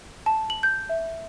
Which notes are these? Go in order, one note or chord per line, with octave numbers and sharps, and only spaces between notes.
A5
F#7
G6
E5